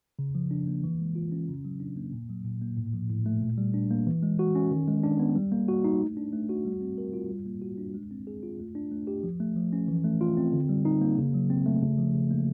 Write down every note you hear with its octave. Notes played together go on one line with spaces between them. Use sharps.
C#3
F3
D4
A#3
E3
G#3
F4
C#4
C#3
F#3
D4
A#3
A#2
F#3
A#2
A#3
A2
F3
A2
A3
A#2
G3
D4
A#3
E3
G#3
F#4
C#4
D#3
G#3
D4
B3
G3
A#3
F#4
D#4
A3
D4
A3
F#4
G3
C4
A#4
F4
G3
A#3
F#4
D4
G#3
C4
G#4
F4
A3
D4
A3
G4
F3
A3
F3
C#4
E3
A3
F4
C4
D3
G3
D#4
A#3
C#3
F#3
C4
A3
C#3
F3
C#3
A#3